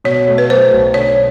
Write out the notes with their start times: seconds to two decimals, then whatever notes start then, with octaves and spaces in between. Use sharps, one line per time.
0.04 B2 C#5
0.27 A3
0.38 B4
0.49 F#3 C5
0.72 B1
0.94 D3 C#5